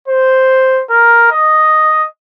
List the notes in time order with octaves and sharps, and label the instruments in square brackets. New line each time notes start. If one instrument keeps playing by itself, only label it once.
[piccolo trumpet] C5
A#4
D#5